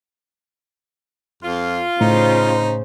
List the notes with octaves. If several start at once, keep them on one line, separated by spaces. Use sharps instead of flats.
F2 F4
A2 C#3 D#4 C5